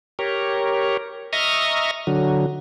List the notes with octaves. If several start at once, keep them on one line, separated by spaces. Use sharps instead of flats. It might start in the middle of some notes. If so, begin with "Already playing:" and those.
G4 A#4 C#5
D#5 E5 A#5 C#6 D#6 F6
D3 F#3